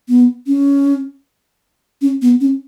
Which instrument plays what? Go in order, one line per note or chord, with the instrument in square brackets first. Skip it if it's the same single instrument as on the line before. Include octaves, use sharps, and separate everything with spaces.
[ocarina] B3
C#4
C#4
B3
C#4